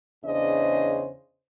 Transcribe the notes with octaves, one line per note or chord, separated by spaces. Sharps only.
E2 C#3 D4 C5 D#5